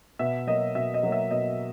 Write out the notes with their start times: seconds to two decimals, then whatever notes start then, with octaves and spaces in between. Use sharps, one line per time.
0.19 B2 E5
0.47 F#3 A#3 D#5
0.75 B2 E5
0.94 D#5
1.03 F#3 A#3
1.12 E5
1.31 B2 D#5